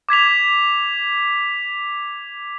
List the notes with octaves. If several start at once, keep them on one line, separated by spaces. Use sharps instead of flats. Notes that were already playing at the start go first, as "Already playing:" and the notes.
D6 G#6 B6 F7